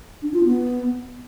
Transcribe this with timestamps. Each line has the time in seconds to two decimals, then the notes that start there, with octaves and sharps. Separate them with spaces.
0.23 D4
0.34 F4
0.45 B3